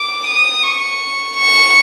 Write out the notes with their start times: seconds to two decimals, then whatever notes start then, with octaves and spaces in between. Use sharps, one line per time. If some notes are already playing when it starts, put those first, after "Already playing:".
Already playing: D6
0.27 D#6
0.63 C#6
1.37 C#6